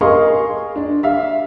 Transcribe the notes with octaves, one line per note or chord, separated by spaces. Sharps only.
G#4 A#4 D#5 F5 C6 C#6
D4
E5 F5